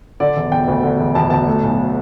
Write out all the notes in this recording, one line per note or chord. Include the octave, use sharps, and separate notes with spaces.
D3 D5
E1
E1 G5
D2
D3
E1
E1 A5
D2 A5
A3
B1